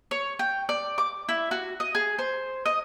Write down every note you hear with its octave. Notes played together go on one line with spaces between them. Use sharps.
C#5
G5
D5
D6
E4
F#4
D#5
G#4
C5
D#5